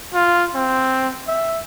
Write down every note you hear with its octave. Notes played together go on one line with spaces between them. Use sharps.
F4
C4
E5